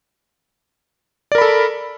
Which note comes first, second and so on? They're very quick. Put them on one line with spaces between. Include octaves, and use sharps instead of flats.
D5 A#4 B5 A4